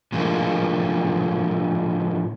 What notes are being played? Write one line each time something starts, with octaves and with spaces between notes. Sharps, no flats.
A2 D3 F3 G#3 A#3